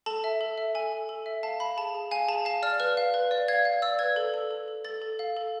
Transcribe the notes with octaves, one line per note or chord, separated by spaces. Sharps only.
A4 A5
E5
A4
E5
A4 G#5
A4
A4
E5
F5 A5
F5 B5
G#4 A5
G#4
F5 G#5
G#4 A5
F5 A5
D5 F6
B4 F6
F5
B4
D5
F5 G#6
F5
D5 E6
B4 G#6
A4
A4
A4
A4
A4 A6
A4
F5
A4